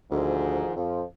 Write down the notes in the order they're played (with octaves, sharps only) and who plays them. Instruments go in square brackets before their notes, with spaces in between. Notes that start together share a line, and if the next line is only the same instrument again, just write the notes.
[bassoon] D2 [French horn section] G#2 D#3 F3
[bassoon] F2 [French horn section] F3